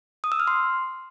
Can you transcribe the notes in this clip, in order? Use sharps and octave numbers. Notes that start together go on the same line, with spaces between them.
D#6
E6
F6
C6